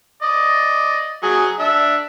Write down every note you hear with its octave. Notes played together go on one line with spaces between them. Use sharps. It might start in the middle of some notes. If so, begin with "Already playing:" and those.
D5 D#5
F#3 G#4
D4 E5